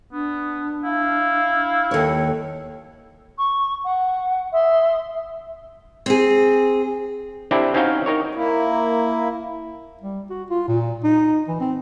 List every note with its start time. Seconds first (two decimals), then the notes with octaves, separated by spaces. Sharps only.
0.12 B3 D4
0.84 E4 F5
1.91 D#2 A4 C#5
3.38 C#6
3.84 F#5
4.53 E5 C6 D#6
6.06 C4 G#4
7.51 C4 D4 E4 G4 A4
7.74 C4 C#4 D#4 F#4 F5 G5
8.06 D#4 A#4 C#5
8.35 A#3 E4
10.02 G3
10.30 F#4
10.50 F4
10.68 A#2
11.03 D#4
11.48 E3
11.60 C4